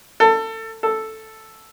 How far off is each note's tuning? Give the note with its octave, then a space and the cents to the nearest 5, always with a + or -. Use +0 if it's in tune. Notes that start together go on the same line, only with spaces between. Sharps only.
A4 +25
A4 +0